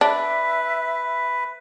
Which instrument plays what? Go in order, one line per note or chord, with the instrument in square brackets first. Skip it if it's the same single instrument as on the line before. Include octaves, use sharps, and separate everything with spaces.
[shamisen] D4 [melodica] B4 [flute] E5